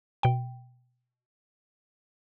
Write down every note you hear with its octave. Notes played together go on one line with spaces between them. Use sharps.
B2 G5